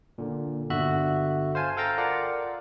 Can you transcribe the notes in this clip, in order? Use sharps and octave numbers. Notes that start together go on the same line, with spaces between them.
A#2 D3
G1 D3 F#4 E5 F#6
C5 F5 G#5 A5
A4 F5 G5 A#5 A6
F4 A#4 D5 F#5